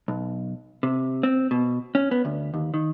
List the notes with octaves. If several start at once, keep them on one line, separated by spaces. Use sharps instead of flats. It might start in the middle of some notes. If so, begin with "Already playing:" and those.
B1
C3
C4
B2
C#4
B3
D2
D#2
D#3